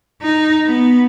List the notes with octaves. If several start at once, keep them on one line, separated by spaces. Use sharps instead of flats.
D#4
B3